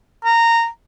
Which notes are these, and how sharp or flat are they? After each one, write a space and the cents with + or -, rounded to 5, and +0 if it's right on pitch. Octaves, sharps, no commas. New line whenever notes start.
A#5 -15